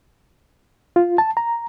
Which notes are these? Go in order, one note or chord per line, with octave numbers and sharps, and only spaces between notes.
F4
A5
A#5